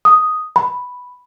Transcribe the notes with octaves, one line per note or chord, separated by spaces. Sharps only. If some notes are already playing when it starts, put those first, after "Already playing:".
D#6
B5